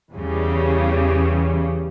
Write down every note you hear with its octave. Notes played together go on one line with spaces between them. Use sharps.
E2 C#3 E3 G3